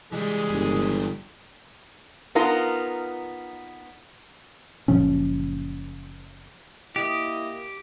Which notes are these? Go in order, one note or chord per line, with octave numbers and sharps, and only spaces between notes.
E3 G3 G#3 G#4
G1
B3 D#4 F4 A#4
F#1 A#2 F3 C#4
A#3 E4 G4 D#5